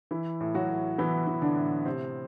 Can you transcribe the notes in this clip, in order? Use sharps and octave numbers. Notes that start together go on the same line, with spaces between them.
E3 E4
A2
F#3 F#4
A2
E3 B3 E4
E3
D3 D4
A2
C3 C4